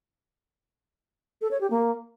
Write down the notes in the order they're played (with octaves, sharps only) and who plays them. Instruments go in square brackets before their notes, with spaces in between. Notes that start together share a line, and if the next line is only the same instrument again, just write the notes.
[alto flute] A4
C#5
G4
A#3